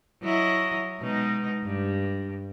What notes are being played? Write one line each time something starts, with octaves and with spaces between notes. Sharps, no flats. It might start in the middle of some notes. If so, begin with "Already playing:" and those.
F#3 E4 D#5
B2 G#3 D#4
G2